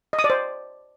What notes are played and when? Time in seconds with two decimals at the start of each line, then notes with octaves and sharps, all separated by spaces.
0.13 D#5
0.19 D#6
0.24 D5
0.30 C5